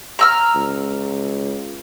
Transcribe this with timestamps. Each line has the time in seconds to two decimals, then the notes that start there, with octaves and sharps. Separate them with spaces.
0.19 A#5 E6 F6
0.55 C#2